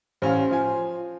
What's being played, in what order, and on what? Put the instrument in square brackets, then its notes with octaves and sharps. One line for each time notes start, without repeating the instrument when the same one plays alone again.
[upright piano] A1 C#4 F5 [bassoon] C5
[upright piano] F3 F4 G#5